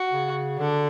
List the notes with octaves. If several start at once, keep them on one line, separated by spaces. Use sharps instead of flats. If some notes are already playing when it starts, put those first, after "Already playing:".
Already playing: F#4
C#3
D3 D4